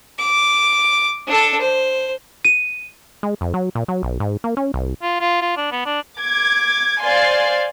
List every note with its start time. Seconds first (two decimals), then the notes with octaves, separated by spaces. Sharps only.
0.18 D6
1.27 D4 A4
1.61 C5
2.45 D#7
3.23 G#3
3.41 F2
3.54 F#3
3.75 A#2
3.88 F#3
4.03 B1
4.20 G#2
4.44 A#3
4.57 C#4
4.74 C2
5.02 F4
5.20 F4
5.42 F4
5.57 D4
5.71 B3
5.86 D4
6.19 D6 G#6
7.01 C5 D5 F5 G#5 C6